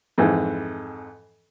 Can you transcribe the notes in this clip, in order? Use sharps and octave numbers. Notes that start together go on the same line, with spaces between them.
F2 G#2 E3